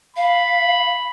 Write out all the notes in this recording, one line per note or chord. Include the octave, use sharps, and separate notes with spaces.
F5 B5